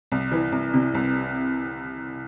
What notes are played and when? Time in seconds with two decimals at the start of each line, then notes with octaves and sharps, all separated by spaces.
0.12 C2
0.31 E3
0.52 C2
0.74 C3
0.94 C2